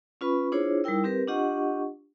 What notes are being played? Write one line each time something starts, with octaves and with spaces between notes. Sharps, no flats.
C#4 F4 B4 B5 C#6
D4 E4 F4 G#4 C5 C#5
G3 D#4 E4 A#4 G5 E6
C4 G4 A#4 B4
D4 F4 G4 D#5 F#5 C#6